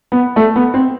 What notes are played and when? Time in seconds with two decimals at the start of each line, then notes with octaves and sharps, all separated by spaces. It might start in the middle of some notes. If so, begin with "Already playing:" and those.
0.12 B3
0.36 A3
0.56 B3
0.74 C4